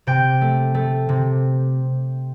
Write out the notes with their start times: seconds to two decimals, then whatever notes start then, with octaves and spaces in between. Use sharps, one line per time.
0.07 C3 G5
0.41 A3
0.74 A3
1.09 C3